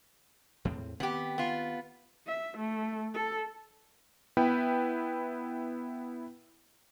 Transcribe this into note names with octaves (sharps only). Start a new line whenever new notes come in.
E2 A2 C4
D#3 B3 C4 G4
B3 F4
E5
A3
A4
B3 E4 B4 G5